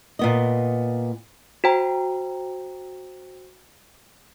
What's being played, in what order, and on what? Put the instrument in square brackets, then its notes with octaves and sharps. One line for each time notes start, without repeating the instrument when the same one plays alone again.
[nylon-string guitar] A#2 B3 D#5
[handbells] F#4 C5 G5 A#5